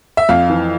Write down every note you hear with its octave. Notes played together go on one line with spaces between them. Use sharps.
E5
F2 F5
E3